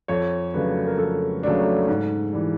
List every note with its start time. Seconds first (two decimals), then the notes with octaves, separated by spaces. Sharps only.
0.08 F2 C#5
0.54 C#3 F#3 A3 D4 B4
0.87 A#4
0.98 F2 A4
1.43 C#3 F#3 A3 D4
1.88 G#2
2.33 E3 G3